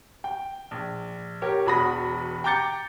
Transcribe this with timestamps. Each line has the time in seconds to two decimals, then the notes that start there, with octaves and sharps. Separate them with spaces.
0.24 G5
0.71 A#1
1.42 G4 A#4 C#5
1.66 E1 E2 F#4 B5 D#6 A#6
2.44 G5 A#5 D6 G6 A6 C#7